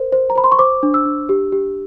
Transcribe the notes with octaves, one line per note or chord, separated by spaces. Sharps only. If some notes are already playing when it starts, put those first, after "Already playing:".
Already playing: A#4 C5
C5
A#5
C5 B5
C6
C#6
C5 D6
D4
E6
D4
G4
G4